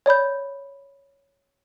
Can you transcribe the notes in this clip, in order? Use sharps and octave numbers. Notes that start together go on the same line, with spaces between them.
C#5 D5 B5 G6